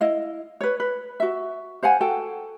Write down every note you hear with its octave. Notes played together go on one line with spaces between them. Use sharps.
E4 D#5 F5
B4 C#5
B4
F#4 E5
C5 F5 F#5 G#5
F#4 A4 G5